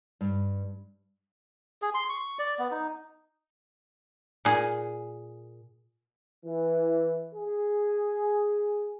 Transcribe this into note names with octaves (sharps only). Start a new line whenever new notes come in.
G2
G#4
C6
C#6
D5
B3
D#4
A#2 G#4
E3
G#4